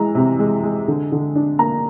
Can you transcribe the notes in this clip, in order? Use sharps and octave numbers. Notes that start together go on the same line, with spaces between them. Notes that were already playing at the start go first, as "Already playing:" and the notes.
Already playing: E3 G#3 A#5
C3
G#3
G#3
D3
D3
D4
A#3 A#5